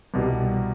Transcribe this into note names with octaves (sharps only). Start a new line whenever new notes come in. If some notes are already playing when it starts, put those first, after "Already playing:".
C2 B2 G3